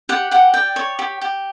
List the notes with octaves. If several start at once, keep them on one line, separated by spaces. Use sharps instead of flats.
G4 F#5
G4 F#5
D5 G5
C#5
G4
G4